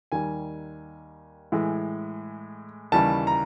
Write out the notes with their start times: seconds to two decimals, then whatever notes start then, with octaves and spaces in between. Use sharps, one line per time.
0.12 D#2 D#3 G3 G#5
1.52 A2 E3 G#3
2.92 D#2 C#3 E3 G3 A5
3.27 A#5